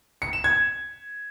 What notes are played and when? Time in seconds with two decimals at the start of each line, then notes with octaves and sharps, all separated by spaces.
0.22 C#7
0.33 E7
0.44 G#6